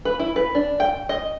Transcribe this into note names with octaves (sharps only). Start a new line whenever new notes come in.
B4
E4
B4
D4
G5
D#5